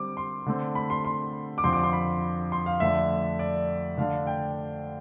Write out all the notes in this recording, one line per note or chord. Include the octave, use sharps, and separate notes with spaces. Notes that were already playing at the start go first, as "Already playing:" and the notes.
Already playing: D3 G3 C4 D6
C6
D3 A3 C4
B5
C6
C6
D6
F2 D3 F3 C4 C6
D6
C6
B5
C6
F5
F2 D3 A3 D4 E5
D5
D3 A3 D4 F5
G5